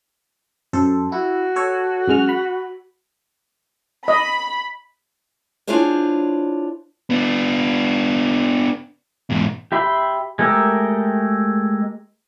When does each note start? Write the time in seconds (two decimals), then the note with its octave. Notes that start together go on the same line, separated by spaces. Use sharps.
0.73 F#2 A4 C5
1.12 E4 F#4
1.56 A4 C#5
2.08 F#2 G#3 F6
2.29 B5
4.08 D#5 B5
5.67 D4 E4 F4 G#4 C5 C#5
7.10 B3 D4
9.30 E2 G#2
9.72 G4 E5 B5 C6
10.39 G#3 A3 G4 A#4 E5